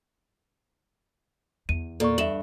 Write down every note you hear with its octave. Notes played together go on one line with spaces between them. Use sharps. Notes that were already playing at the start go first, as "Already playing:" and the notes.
E2 D#7
A#2 A4 D5 C#6
G2 E5 E7 F#7